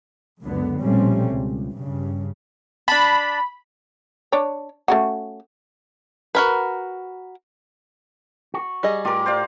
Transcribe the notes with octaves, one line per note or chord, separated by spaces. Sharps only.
C#2 F#2 D3 B3
A#1 B2 G3 A3 C4 C#4
C#2
G2 C#3
D4 A5 B5
D4 C#5
A3 C#4 F#4
F#4 A#4 B4
F#4
G3 G#4 D#5
A2 F4 G4 A#4
C5 D5 F5